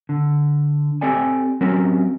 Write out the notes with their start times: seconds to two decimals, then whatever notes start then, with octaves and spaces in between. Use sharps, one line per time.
0.09 D3
1.01 C4 G4 A4 D5 G5 G#5
1.61 F#3 C4 C#4 A#4